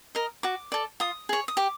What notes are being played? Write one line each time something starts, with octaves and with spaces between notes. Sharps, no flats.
A#4 D#5
F#4 D6
A4 D5
F4 D#6
G#4 C#5
D#6
G4 D6